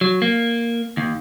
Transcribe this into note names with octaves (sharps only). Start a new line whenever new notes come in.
F#3
A#3
D#2